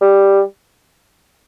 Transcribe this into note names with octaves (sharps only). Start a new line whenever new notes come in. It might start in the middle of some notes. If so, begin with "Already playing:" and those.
G3